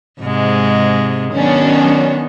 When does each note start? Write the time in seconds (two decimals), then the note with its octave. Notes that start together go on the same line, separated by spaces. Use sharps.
0.22 G#2 C3 G#3
1.34 D#3 F#3 B3 C#4 D4